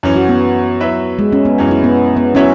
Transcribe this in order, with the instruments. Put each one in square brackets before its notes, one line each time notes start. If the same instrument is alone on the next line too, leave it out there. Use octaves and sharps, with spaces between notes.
[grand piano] F#2 E3 C#4
[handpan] F#4
B3
[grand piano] F#3 E4 B4 E5
[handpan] G#3
C#4
B3
[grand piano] F#2 E3 C#4
[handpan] E4
B3
B3
[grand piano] F#3 E4 C#5 E5 [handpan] C#4